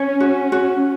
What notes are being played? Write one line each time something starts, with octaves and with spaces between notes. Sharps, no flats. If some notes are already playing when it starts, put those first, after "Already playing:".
Already playing: C#4 C#5
F#4
F#4